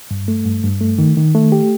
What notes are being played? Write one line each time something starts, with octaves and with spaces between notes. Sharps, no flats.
G2
A3
G2
G2
A3
D#3
D#3
A3
G4